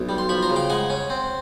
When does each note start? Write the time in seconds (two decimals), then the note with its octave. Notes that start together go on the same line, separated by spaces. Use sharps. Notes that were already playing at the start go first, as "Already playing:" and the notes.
Already playing: B1
0.09 G3
0.18 C6
0.29 F3 B5 C#6
0.43 A#5 C6
0.50 C#3
0.56 F5 G5
0.70 G#3 F#5 G#5
0.90 C#4
1.10 C4